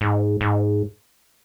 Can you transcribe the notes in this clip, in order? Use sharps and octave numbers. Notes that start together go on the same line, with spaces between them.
G#2
G#2